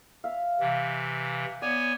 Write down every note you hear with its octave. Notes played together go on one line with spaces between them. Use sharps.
E5 F5
C3 E3
B3 C#5 D5 G#5